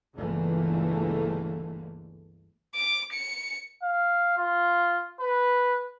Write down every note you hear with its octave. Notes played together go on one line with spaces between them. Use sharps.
G1 C#2 D3 E3 A3 A#3
D6
C#7
F5
F4
B4